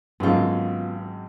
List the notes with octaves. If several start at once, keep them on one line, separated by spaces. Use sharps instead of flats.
G#1 F#2 B3 F4